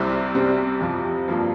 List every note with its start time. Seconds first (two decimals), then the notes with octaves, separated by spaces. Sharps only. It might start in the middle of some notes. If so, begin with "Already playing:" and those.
Already playing: C2 C3 G3 C4 E4
0.35 C2 C3 G3 C4
0.80 F2 C3 F3
1.28 G2 F3 A#3 F4